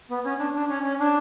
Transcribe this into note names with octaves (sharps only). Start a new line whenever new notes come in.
B3
C#4
D4
D4
C#4
C#4
D4